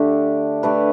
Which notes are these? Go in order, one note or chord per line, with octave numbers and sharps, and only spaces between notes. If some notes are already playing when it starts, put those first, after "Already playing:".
Already playing: D3 A3 D4 G4
A3 D4 G4 B4